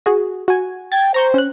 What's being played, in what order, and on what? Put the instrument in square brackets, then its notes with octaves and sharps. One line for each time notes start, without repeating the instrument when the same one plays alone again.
[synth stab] F#4 G#4
F#4 G#5
[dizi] G5 [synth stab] G#6 A6
[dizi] C5 [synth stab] A#5 C#6 G6
[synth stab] C#4 F#6